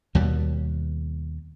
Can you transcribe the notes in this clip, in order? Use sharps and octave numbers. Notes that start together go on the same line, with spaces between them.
D#2 B2 G3